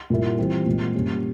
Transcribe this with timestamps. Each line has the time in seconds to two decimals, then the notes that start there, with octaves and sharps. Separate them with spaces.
0.10 A#2 G3 A#3 E4
0.38 E3 G3 C4 F4
0.66 A#2 G#3 C4
0.95 A#2 G3 C#4